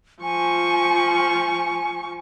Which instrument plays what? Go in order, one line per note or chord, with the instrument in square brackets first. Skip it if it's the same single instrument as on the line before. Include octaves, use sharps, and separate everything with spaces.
[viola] F3 C#6 [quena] G#5